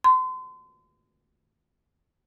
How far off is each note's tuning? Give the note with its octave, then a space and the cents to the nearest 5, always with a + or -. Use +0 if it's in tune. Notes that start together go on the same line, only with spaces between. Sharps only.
C6 -35